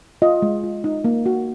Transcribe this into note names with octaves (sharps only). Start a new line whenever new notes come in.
F4 D#5
G#3
F4
D#4
A#3
F#4